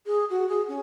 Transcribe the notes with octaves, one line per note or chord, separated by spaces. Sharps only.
G#4
F#4
G#4
C#4